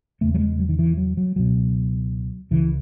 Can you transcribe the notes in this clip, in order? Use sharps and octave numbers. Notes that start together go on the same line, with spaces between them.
E2 C#3 A3
F#3
G#3
F#3
D#3
E3
F#3
F#3
C#2 B2 F#3
C#2 C#3 E3